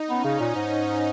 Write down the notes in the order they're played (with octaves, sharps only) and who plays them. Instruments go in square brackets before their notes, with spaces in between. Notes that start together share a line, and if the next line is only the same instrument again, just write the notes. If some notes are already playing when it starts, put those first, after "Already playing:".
Already playing: [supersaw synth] D#4
[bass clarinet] B3 [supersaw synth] C#4
[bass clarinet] C#3
A#2
G#2